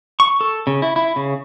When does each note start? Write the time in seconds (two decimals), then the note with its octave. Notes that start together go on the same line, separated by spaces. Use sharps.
0.20 C#6
0.41 A4
0.67 C#3
0.82 E4
0.96 E4
1.16 C#3